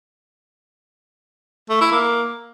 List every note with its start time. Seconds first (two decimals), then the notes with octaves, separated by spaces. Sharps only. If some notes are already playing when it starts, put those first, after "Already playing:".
1.70 A3
1.81 E4
1.92 A#3